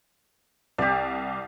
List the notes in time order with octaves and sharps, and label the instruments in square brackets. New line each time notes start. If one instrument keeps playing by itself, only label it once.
[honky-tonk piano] C2 [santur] G4 D5